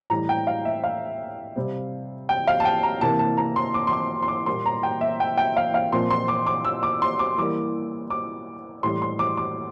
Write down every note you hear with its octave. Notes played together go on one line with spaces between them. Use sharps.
A2 E3 G3 A#5
G5
F5
E5
F5
C3 G3 C4
G5
F5
A5
G5
A#5
C3 E3 A#3 A5
A5
A#5
C6
D6
C6
D6
C6
D6
A#2 G3 A#3 C6
A#5
G5
E5
G5
G5
F5
F5
A#2 F3 C4 C6
C6
D6
D6
E6
D6
C6
D6
E3 G3 A#3 D6
D6
A2 E3 G3 C6
C6
D6
D6